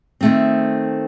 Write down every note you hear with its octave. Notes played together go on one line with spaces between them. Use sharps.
D#3 A3 C4